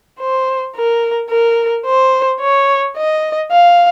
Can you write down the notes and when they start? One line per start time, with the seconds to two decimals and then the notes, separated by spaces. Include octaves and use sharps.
0.20 C5
0.76 A#4
1.30 A#4
1.86 C5
2.41 C#5
2.97 D#5
3.51 F5